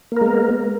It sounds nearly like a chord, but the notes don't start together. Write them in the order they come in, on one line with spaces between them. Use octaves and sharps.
A#3 A#4 G#3 B3